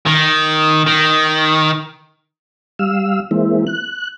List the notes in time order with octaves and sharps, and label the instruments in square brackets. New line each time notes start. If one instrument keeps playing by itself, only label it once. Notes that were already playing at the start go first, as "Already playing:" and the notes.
[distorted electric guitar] D#3
D#3
[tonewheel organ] G3 F5 E6
E3 G#3 A#3 C4 E4
F#6